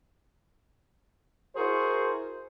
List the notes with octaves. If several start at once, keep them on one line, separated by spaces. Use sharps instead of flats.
E4 F#4 G#4 A#4 C5